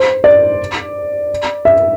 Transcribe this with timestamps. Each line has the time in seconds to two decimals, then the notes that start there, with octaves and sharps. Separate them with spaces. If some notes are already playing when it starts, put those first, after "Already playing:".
Already playing: C5
0.24 D5
1.65 E5